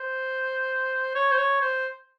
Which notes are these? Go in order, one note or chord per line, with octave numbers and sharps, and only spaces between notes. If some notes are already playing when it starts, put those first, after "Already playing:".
Already playing: C5
C#5
C5
C#5
C5